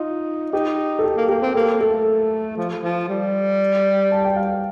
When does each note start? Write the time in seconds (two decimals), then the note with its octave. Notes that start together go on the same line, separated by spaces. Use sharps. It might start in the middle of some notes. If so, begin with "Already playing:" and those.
Already playing: D#4 F4
0.52 D#4 G4
0.99 A4
1.04 G4
1.17 A#3
1.29 A#3 G4
1.42 C4
1.55 A#3 A4
1.81 A3 A4
2.57 F3
2.84 F3
3.09 G3
4.11 A5
4.25 G5
4.36 F5